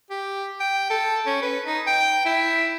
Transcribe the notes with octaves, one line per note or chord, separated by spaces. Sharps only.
G4
G5
A4
C#4
B4
D#4
G5
E4